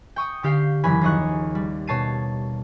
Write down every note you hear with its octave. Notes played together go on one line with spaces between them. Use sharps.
G5 C#6 D#6
D3 G4 F5 G5 C7
F#1 E3 C#4 G#5 B5
D#2 F3 G#4 D#5 C#6 F#6
G3
B2 C#5 A5 C7 D#7